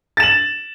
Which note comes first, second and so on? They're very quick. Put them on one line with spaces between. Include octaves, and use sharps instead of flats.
A6 E7 F#7